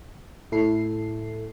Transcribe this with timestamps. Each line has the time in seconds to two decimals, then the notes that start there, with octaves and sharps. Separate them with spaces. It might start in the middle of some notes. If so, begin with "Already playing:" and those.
0.52 A2 E4 A4 C7